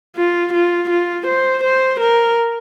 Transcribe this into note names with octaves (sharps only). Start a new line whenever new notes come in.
F4
F4
F4
C5
C5
A#4